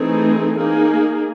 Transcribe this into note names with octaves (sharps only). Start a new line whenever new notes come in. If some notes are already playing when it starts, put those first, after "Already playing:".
Already playing: E3 A3 C4 D#4 G#4
A#3 D#4 G#4